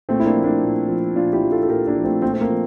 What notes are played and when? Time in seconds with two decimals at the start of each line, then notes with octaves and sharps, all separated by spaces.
0.09 A#2 A3 C4
0.20 E4
0.26 A#3 D4
0.35 F3
0.44 A#3 D4
0.63 A#2
0.89 F3
1.15 A#2 D4 F4
1.33 E4 G4
1.43 F3
1.52 F4 A4
1.63 A4
1.69 A#2 G4 A#4
1.88 A#3 D4
1.96 F3
2.04 A3 C4
2.22 A#2 A3 C4
2.34 C4
2.41 A#3
2.50 F3